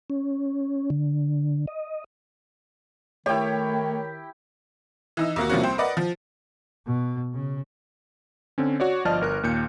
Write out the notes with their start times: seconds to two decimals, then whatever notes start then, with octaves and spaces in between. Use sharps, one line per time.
0.10 C#4
0.90 D3
1.67 D#5
3.26 D#3 A3 E4 G4 C#5 G5
5.17 E3 D#4 E6
5.36 D#2 A#3 F#4
5.50 C3 F3 G3 A#3 C#4 F#4
5.63 C2 C5 G5
5.78 A#4 B4 D5 D#5 F#5
5.97 F3
6.86 B2
7.33 C#3
8.58 D3 C4 C#4
8.80 F#4 C#5 D5
9.05 G1 F3 D5 D#5 A5 F6
9.21 G1 A#4 F#6
9.43 D#2 A#2 G6 C#7